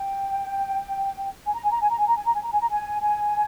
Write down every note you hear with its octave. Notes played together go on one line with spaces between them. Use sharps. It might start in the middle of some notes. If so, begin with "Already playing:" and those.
Already playing: G5
G#5
A#5
G#5
A#5
G#5
A#5
G#5
A#5
G#5
A#5
G#5
A#5
G#5
A#5
G#5
G#5